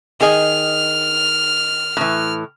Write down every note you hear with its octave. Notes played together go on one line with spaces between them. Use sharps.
D#3 G#4 D#5 F6
A2 E3